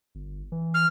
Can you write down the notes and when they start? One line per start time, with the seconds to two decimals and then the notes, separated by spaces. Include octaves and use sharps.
0.15 G1
0.52 E3
0.74 F6